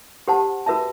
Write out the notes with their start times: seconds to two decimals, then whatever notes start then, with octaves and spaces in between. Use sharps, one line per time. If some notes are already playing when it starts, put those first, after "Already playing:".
0.28 G4 C5 F#5 A5
0.66 F#4 B4 E5 A5